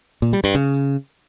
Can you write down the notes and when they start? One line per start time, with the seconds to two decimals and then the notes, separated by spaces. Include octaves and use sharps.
0.22 A#2
0.33 G3
0.44 G2
0.55 C#3